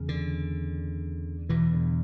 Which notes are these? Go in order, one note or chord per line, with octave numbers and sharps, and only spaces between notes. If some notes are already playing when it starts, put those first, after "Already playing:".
Already playing: E2 C#3
D3
E2 B2 E3
D3